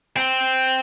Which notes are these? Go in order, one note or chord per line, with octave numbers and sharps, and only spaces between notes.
C4